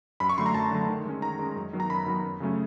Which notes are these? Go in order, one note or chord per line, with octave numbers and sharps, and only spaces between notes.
F#2 B5
C#6
D3 F#3 A3 C6
A#5
F#2 A5
D3 F#3 A3
D#3
G#3 C#4
D#3 A#5
G#3 C#4
F#2
D#3 F#3 B3
A#5
F#2 B5
D#3 F#3 B3
F#2
C#3 F#3 A3 C#4